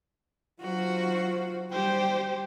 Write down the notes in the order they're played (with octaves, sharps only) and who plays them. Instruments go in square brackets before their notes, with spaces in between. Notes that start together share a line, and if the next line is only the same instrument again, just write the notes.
[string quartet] F#3 F#4 [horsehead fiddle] F4 C5
[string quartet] G3 [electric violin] G4 C5 [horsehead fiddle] G5